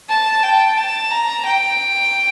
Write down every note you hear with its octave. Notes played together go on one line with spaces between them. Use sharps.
A5
G5
A5
A#5
G5